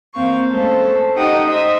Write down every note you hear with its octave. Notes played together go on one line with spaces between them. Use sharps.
E2 A#3 C4 F5 C#6
G#3 A3 C#4 A4 C5
D#4 G4 D#5 F#5 G5 D#6
C5 D#5 E5 D#6